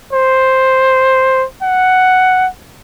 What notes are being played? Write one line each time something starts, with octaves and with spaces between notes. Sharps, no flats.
C5
F#5